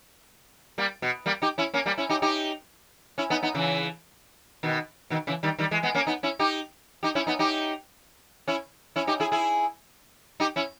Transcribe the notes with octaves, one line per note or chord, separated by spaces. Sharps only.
G3 A#3
B2
G3 A#3
D#4 G4
C#4 E4
A#3 C#4
G3 A#3
C#4 E4
D#4 G4
D#4 G4
C#4 E4
B3 D#4
B3 D#4
C#3 E3
B2 D#3
B2 D#3
C#3 E3
D#3 G3
D#3 G3
E3 G#3
G#3 B3
A#3 C#4
B3 D#4
C#4 E4
D#4 G4
D#4 G4
C#4 E4
B3 D#4
D#4 G4
C#4 E4
C#4 E4
D#4 G4
E4 G#4
E4 G#4
D#4 G4
C#4 E4